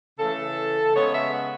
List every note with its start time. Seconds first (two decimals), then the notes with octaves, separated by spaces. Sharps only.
0.19 C#3 E3 A3 A4
0.94 C#3 G#3 B3 C#5
1.14 E5
1.32 F#5